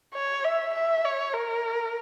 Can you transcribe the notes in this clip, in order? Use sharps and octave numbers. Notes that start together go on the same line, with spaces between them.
C#5
E5
E5
C#5
A#4